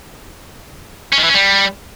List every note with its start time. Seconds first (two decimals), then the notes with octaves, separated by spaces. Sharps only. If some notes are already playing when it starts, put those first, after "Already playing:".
1.12 C#4
1.18 D#3
1.23 E3
1.29 C#4
1.34 G3